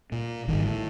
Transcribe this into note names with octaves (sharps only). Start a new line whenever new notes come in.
A#2
G#1 G2 D#3
A2